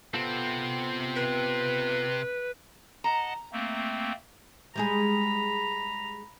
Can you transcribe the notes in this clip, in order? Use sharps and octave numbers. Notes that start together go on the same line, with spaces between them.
C3 B3 C4 F4 A4
B4
D#5 F#5 A5 A#5
A3 A#3 C4
G3 G#3 G#4 A#5 B5